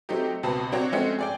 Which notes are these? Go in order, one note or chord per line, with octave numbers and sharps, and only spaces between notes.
F#3 A3 C4 D#4 G4
C#2 B2 C4 B4 A5
F#3 C4 D4 F#4 C#5
F3 G#3 A3 C4 C#4 F#4
G#4 D5 G5